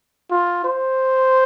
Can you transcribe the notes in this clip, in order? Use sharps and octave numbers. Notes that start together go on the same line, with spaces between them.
F4
C5